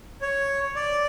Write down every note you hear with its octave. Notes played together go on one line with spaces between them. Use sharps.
C#5
D5